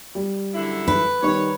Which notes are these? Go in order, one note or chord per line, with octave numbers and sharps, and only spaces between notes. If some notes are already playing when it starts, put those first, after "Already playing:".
G3
F#2 D3 E4
B4
D#3 G3 D#4 C#5